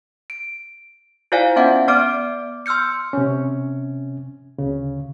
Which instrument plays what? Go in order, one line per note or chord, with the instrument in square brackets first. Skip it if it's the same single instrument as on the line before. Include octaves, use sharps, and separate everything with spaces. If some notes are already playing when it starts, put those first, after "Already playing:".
[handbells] D7
E4 F4 C5 D5 F5 G#5
B3 C#4 E5 F#5
B3 D5 D6 F6 D7
C6 E6 F6 G6 C#7
[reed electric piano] C3 C#4
D2 C#3